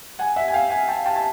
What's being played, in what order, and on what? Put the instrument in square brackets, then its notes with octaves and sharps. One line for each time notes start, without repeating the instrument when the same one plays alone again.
[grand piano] F#5 G#5
E5 F#5
G#5
F5 G5
F#5 G#5
G5 A5
G5 A5
A5